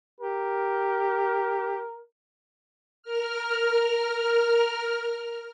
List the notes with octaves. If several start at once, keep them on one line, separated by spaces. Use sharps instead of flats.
G4 A#4
A#4 F6